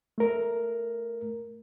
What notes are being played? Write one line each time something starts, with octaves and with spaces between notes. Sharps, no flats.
A3 A#4